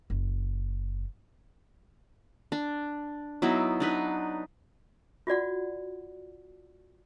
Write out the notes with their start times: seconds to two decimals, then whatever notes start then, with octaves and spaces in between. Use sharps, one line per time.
0.10 F#1
2.52 D4
3.42 F#3 B3 D#4 E4
3.80 D4 D#4 B4
5.27 F4 F#4 D5 F#5